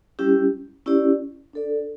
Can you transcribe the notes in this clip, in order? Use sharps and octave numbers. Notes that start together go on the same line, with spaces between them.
G3 C#4 E4 G4
C#4 E4 G4 D5
D4 A4 D5